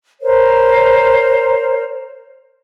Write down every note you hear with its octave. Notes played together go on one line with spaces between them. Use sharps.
A#4 C5 C#5